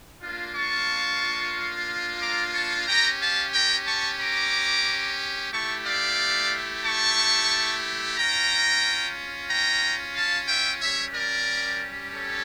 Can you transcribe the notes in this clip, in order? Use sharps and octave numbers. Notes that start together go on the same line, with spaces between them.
A#3 D4 F4
A5 C#6
A#5 D6
A5 C#6
C#4 G4 G5 A#5
F5 A5
G5 A#5
A5 C#6
A#5 D6
A3 E4 G4 A5 C#6
D5 F5
A5 C#6
C#4 F4 G5 A#5
G5 A#5
F5 A5
E5 G5
G3 C#4 G4 C#5 E5
A#4 D5
A4 C#5